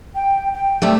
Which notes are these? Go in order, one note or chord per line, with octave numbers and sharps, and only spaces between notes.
G5
G5
C3 G3 A3